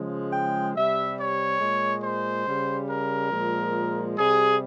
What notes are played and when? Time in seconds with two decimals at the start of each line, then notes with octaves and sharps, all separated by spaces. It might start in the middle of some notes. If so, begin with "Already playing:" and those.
Already playing: C#3 F3 G#3
0.33 G5
0.75 C3 G3 E5
1.18 C#5
1.61 A#2 G#3
2.03 C5
2.47 C#3 G3
2.90 A#4
3.32 A#2 F3 G#3
4.18 C3 G3 G#4